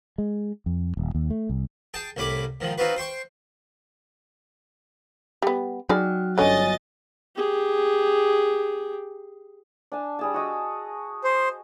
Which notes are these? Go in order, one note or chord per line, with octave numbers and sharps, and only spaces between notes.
G#3
F2
D#1
D#2
A3
C2
G#4 G5 A5
C2 A2 C#4 B5 D6
G#2 D#3 F3
C4 D#4 F4 F#4 B4
C5 G5 C6 C#6
G3 B3
F#3 D#4 G#4 D5 G5 F6
G1 D3 C#4 C#5 D#5 G#5 A6
G4 G#4
D4 G#5 A5
G3 G#4 A5
F#4 D#5 E6
C5